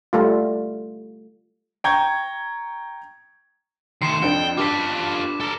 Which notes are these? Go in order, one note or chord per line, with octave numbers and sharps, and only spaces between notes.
G3 A3 F4
G5 A#5 C#6 G6 G#6
D#3 A3 C6 C7 C#7 E7
F2 C4 D4 G5
G2 F4 A4 D6 B6
A4 A#4